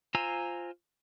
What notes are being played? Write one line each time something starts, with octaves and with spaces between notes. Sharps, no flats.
F4 C5 G#5 A#5 E6